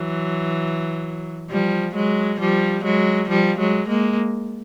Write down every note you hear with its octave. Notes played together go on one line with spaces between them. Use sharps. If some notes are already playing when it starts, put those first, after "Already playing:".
Already playing: E3 F#3
F3 G3
F#3 G#3
F3 G3
F#3 G#3
F3 G3
F#3 G#3
G#3 A#3